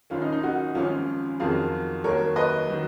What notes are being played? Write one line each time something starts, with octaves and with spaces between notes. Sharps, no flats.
F#1 F#2 D#3 C#4 F4
D#4
D#4
D#4 F#4
G#1 F#2 F3 C#4 F4
F2 D#3 F#3 F4 G#4
D#2 D#3 F#3 A#4 C#5
B4 D#5
D#3 F#3